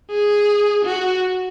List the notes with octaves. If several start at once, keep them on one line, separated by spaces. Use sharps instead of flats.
G#4
F#4